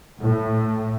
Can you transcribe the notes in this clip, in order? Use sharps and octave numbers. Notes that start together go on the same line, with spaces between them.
A2